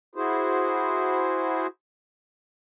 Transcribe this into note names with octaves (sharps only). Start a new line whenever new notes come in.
E4 F#4 G#4 C5